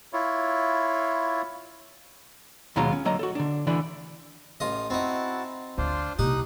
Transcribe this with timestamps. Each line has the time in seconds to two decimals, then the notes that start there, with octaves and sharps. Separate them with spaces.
0.13 E4 F4 C#5
2.76 D#2 B2 F#3 G#3 F4 A#5
2.92 C#4
3.05 D3 F#3 A#3 D#5 A#5
3.19 F#4 A4
3.35 D3 D4
3.67 D2 D3 E3 D4 D5
4.60 A1 F4 D#5
4.90 C4 D#4 E4 F#4 A5
5.78 D2 D4 F4 C5
6.19 C2 A#2 D#4 G4 D#6 F#6